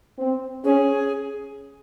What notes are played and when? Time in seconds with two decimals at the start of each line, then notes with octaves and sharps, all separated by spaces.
0.19 C4
0.64 C#4 G#4